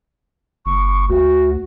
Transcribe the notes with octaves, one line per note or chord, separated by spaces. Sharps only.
F#1 C#6
D2 F#4